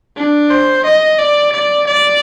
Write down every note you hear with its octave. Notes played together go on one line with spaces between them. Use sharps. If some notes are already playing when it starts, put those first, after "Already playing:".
D4
C5
D#5
D5
D5
D5